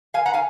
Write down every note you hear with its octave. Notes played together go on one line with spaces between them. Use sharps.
F5 G#5
F#5 A#5
F5 G#5